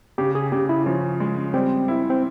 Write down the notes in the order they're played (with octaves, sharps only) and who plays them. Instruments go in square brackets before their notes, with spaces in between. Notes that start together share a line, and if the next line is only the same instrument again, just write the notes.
[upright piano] C#3 [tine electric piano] G4
[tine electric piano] G#4
[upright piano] C#3 [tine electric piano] G4
[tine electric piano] E4
[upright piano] F3 [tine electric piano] C#4
[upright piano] G#3
[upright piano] G3 [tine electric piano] C4
[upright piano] E4
[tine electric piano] C4